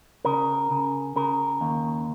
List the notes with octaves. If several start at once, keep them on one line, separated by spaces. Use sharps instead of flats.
C#3 A#4
C#3
C#3 A#4
D#2